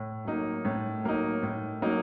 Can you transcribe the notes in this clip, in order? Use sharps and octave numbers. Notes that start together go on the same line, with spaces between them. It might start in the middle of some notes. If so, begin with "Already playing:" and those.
Already playing: A2
F#3 A#3 D#4
A2
F#3 A#3 D#4
A2
F#3 A#3 D#4